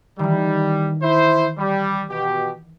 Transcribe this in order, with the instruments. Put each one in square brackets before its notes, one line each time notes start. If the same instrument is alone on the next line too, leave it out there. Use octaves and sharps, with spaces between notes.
[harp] D#3 E3 [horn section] G3
[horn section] E4 C5
G3
B2 G4